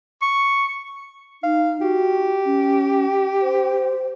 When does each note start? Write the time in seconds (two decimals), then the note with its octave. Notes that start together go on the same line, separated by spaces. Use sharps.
0.22 C#6
1.43 D#4 F5
1.81 F#4 G4
2.46 C#4
3.42 C5